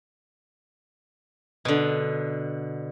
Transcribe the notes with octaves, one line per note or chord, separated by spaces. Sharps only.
B2 D3